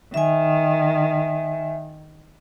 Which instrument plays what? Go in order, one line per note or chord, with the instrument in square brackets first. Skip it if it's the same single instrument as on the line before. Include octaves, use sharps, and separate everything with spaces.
[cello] D#3 [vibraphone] E5 G#5